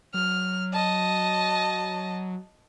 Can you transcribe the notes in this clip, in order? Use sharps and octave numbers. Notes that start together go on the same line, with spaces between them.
F#3 F6
D#5 A5